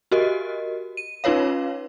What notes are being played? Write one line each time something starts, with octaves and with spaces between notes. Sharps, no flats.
F#4 G4 A#4 D#5
D#7
C#4 D#4 F4 B4 C#5 F5